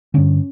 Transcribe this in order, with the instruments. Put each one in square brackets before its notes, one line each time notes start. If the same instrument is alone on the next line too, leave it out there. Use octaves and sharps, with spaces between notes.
[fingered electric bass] G2 D3 C#4